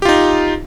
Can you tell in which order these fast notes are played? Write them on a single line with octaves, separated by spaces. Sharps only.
G4 F4 D#4